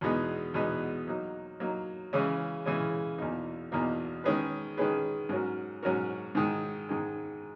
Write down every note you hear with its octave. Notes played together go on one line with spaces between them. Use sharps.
E2 B2 G#3 B3 D#4
E2 B2 G#3 B3 D#4
F#3 A#3 D#4
F#3 A#3 D#4
C#3 E3 G#3 C#4
C#3 E3 G#3 C#4
E2 B2 A#3 D#4
E2 B2 A#3 D#4
D#3 G#3 C#4 G#4 B4
D#3 G#3 C#4 G#4 B4
G#2 F#3 C#4 F#4 A#4
G#2 F#3 C#4 F#4 A#4
G#2 D#3 G#3
G#2 D#3 G#3